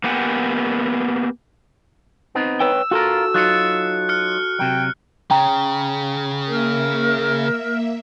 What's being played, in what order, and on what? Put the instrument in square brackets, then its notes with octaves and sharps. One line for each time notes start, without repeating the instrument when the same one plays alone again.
[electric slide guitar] A#3 B3 G4 F#5 G#5
[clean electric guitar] B3 C4 D#4
[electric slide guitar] B4 C#5 G5 [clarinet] E6
[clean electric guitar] F4 A#4 [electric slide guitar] F#4 A4
[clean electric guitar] F#3 D#4 F4 [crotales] F#6 C#7
[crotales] F6 F#6 C#7
[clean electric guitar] C3 F#3 [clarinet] G5
[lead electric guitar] C#3 [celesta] G5 A#5
[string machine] A#3 E5 [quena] A#4